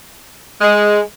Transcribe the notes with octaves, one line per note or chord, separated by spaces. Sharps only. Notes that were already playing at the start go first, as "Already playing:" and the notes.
G#3